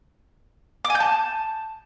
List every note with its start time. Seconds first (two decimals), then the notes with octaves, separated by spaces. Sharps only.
0.85 D6
0.90 G#5
0.95 G6
1.00 A5